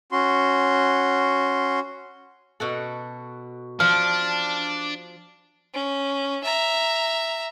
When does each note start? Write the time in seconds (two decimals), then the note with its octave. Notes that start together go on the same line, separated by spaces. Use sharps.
0.12 C#4 F#4 C6
2.60 B2 F#4 A4
3.80 F3 D4 F6
5.74 C#4
6.44 E5 A#5